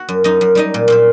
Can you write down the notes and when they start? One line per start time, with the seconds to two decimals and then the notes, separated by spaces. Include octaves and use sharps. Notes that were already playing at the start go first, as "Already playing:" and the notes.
Already playing: F#4 F#5
0.09 F#2
0.24 F#2 D#4 D#5
0.41 F#2
0.55 G3 D#4 D#5
0.74 A#2
0.88 A#2 C4 C5